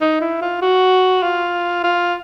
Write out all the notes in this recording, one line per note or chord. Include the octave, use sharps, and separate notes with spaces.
D#4
E4
F4
F#4
F4
F4